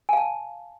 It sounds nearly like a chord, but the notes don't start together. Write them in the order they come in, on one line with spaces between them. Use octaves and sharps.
G#5 F5 A5